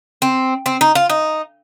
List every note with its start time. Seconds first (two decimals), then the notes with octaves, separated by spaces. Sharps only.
0.22 C4
0.66 C4
0.81 D#4
0.95 F4
1.10 D#4